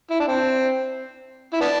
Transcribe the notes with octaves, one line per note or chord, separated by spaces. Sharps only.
E4
D4
C4
E4
B3 D4